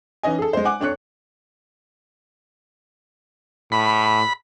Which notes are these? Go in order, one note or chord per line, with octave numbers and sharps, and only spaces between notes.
E3 C#4 D#4 D#5 G#5
G#4 A4
G#3 C5
F#5 G#5 D6 F#6
F2 D4 C#5 F#6 C#7
A2 B5